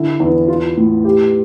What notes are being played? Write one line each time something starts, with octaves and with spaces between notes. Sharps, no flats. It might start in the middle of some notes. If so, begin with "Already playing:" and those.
Already playing: D3 E4
E2
F4
A2
G4